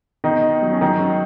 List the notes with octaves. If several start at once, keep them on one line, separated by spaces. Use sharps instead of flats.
B2 D#3 D#4
B2
F#3
C#4
D#3 F#3 D#4
F#3